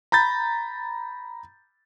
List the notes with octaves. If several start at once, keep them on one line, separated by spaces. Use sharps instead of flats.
A#5 B5 G6 A6